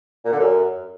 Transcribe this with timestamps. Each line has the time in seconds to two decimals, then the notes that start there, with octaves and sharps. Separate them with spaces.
0.25 A#2
0.32 D3
0.39 F#2